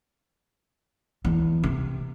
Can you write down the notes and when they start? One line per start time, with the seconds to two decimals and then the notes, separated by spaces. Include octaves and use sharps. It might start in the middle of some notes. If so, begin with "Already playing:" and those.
1.25 E2
1.64 C3